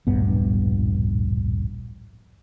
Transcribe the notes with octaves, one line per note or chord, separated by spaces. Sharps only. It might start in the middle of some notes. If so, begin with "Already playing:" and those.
D1 A#1 G2 B3